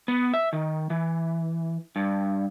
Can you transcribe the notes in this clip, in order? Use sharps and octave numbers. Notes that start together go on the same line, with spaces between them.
B3
E5
D#3
E3
G2